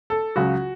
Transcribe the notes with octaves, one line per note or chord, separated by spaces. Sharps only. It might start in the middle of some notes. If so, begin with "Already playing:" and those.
A4
C#2 C#3 F#3 F#4